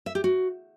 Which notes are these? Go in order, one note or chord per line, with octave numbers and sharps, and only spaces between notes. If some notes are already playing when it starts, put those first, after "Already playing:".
E5
G4
F#4